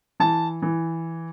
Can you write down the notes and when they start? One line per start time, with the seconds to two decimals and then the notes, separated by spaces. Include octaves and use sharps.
0.20 E3 A5
0.62 E3